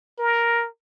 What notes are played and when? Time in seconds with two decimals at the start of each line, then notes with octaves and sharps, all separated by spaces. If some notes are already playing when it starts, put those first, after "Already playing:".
0.19 A#4